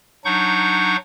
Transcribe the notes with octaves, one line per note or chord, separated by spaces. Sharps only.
F#3 D4 D#4 F#5 C#6 G6